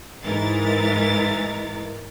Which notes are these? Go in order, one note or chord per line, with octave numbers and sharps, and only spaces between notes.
G#2 E3 G#3 A#4 A6